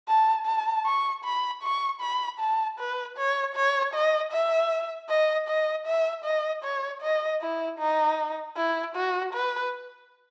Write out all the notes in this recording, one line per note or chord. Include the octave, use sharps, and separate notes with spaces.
A5
A5
C#6
B5
C#6
B5
A5
B4
C#5
C#5
D#5
E5
D#5
D#5
E5
D#5
C#5
D#5
E4
D#4
E4
F#4
B4